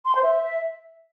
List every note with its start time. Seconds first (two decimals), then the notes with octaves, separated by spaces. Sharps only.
0.06 C6
0.14 C5
0.22 E5